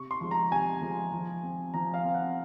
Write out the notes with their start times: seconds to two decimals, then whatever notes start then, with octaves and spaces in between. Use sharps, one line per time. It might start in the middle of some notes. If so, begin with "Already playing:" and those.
Already playing: C3 C#6
0.11 C6
0.21 F3 G#3
0.31 A#5
0.51 C3 G#5
0.81 F3 G#3
1.12 F3
1.43 C4
1.74 F3 A#5
1.94 F5
2.05 C4
2.14 F#5